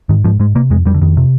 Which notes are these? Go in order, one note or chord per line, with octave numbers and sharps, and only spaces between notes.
G#2 D#3
G#2 F3
G#2 G#3
C3 A#3
F2 G#3
F2 G3
D3
F2 D#3
C3